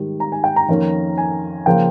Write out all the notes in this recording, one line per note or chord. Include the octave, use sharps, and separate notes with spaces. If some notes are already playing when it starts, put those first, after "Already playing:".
Already playing: G#2 D#3 G3
A#5
G#5
G5
A#5
F2 D#3 A#3 C#4
G#5
C#3 F3 A#3 G5